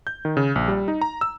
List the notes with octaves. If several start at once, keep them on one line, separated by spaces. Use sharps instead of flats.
G6
D#3
C#3
A#1
G3
D#4
A#5
E6